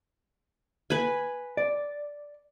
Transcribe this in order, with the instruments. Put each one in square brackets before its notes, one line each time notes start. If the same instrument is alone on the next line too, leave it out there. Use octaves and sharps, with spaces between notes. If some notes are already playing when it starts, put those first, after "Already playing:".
[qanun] B4 G#5
[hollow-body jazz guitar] D5